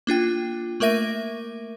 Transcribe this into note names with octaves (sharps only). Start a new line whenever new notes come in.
A#3 D4 F4 G5
A3 A#3 A#4 E5 A#6 D#7